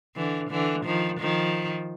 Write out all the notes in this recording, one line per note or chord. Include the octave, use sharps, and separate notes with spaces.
D3 E3
D3 E3
D#3 F3
D#3 F3